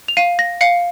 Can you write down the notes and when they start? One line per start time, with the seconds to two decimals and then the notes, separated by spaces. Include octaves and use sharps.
0.08 F7
0.17 F5 D#7
0.39 A#6
0.61 F5 C#7